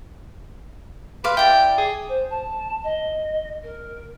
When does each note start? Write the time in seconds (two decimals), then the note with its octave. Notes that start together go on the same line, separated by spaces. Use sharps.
1.24 B4 F5 C6 D6
1.37 E4 G4 D5 G5
1.78 G#4
2.09 C5
2.30 A5
2.84 D#5
3.63 A#4